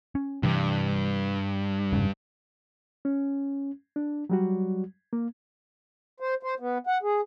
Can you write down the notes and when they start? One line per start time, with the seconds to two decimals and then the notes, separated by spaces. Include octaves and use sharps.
0.15 C#4
0.43 G2 C3 E3 G3
1.93 F1 G#2 C#3
3.05 C#4
3.96 D4
4.30 F#3 G3 F#4
5.13 A#3
6.20 C5
6.43 C5
6.60 B3
6.87 F#5
7.03 G#4